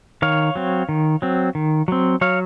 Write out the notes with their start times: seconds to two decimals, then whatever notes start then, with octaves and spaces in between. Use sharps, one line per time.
0.22 D#3 C#5 F5
0.56 F#3 C4
0.89 D#3
1.22 F#3 C4
1.55 D#3
1.88 F#3 C4
2.21 F#3 C#5 F5